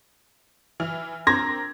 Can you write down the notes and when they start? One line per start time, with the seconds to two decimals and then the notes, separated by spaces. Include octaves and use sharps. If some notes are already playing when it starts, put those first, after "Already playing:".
0.80 E3 F6 F7
1.27 C4 D4 A#4 C6 D6 G#6 A#6